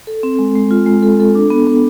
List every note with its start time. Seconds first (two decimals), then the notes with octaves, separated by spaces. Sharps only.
0.07 A4
0.23 C4
0.39 G#3
0.55 G#3
0.71 F4
0.86 G#3
1.03 A4
1.20 A4
1.35 D4
1.50 B3
1.67 B3